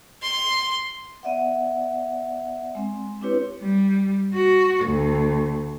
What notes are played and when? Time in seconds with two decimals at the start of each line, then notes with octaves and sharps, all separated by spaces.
0.22 C6
1.23 B3 D5 E5 F#5
2.75 G#3 C4
3.22 C4 D4 E4 G4 B4 C#5
3.61 G3
4.33 F#4
4.85 D2